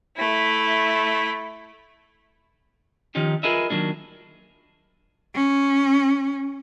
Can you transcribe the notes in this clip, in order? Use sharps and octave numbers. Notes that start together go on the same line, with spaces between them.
A3 E4
D#3 F3 C#4 D#4 G4
F4 G#4 A#4 B4 D#5 E5
D#3 E3 F#3 A#3 D4
C#4